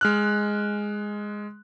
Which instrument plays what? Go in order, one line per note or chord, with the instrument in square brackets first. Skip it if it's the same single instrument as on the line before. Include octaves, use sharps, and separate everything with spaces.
[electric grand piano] G#3 F6 F#6